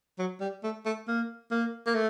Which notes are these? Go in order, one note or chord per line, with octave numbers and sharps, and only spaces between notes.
F#3
G3
A3
A3
A#3
A#3
A#3
A3